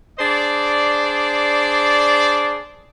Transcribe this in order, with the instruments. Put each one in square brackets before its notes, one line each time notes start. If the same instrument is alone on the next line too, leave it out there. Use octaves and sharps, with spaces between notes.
[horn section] D4 G#4 C5 D5